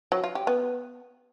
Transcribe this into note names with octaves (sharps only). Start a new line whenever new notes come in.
F#3
F4
G4
B3